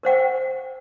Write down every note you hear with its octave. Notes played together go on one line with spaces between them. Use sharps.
A#4 C5 F#5 G5